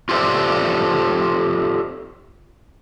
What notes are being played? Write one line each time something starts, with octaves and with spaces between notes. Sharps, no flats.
F4 G4 A4 C5 D5 E5